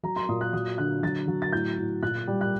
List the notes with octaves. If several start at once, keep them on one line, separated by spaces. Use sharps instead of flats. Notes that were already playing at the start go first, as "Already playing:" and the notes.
F#3 A#5
C6
A#2 D#6
F#6
F#3 D#6
D3 F#6
F#3 A6
F#3
A6
A2 G6
A2
A#2 F#6
G3
F#6